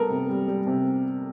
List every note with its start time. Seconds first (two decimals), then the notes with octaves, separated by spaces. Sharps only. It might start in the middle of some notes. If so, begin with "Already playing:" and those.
Already playing: G3 B3 A4 A#4
0.10 C3
0.29 G3
0.48 G3
0.67 C3